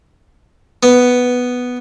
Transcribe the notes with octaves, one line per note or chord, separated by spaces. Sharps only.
B3